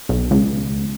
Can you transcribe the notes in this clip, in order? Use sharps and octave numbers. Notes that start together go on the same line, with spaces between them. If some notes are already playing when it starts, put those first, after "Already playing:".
B1
C#2